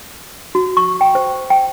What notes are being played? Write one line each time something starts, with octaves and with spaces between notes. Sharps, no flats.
F#4
C#6
G5
C5
G5